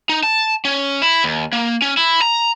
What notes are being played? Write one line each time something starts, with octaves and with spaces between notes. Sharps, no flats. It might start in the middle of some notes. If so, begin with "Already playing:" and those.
D#4
A5
C#4
E4
D#2
A#3
C#4
E4
A#5